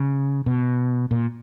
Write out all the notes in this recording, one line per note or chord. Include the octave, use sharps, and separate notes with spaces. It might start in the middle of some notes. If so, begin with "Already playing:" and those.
Already playing: C#3
B2
A#2